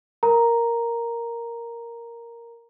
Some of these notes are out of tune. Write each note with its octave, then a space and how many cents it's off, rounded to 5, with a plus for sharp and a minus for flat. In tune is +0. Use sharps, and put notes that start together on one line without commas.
A#4 +0 A#5 +0